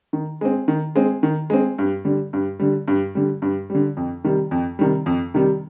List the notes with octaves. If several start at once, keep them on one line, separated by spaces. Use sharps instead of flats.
D#3
G#3 C4
D#3
G#3 C4
D#3
G#3 C4
G2
D3 G3
G2
D3 G3
G2
D3 G3
G2
D3 G3
F2
C3 D#3 G3
F2
C3 D#3 G3
F2
C3 D#3 G3